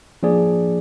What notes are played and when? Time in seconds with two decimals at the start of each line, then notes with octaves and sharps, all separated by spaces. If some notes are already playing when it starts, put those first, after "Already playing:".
0.23 F3 A#3 D4 G#4 D5